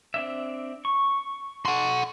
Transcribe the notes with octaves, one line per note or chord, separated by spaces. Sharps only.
C4 D4 E5
C#6
F#4 F#5 C6